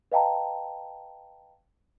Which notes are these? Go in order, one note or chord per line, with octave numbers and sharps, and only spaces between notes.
B4 D#5 F5 G5 A5 A#5